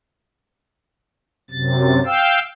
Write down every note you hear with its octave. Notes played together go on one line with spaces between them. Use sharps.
F#2 C3 A6
F5 G5 E6